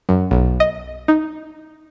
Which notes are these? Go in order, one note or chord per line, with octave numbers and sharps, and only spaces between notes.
F#2
B1
D#5
D#4